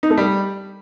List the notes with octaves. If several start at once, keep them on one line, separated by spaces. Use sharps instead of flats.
D#4
A3
G3